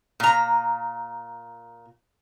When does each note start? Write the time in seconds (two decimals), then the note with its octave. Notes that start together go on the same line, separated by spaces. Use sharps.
0.20 A#2 A#5